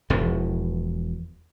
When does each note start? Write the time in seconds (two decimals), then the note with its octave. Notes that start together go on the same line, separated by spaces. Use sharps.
0.10 E1 E2 E3 F3